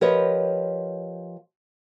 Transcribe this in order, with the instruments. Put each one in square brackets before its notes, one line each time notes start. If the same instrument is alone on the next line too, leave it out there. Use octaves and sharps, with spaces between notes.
[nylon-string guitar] F3 G4 A#4 B4 C#5 D#5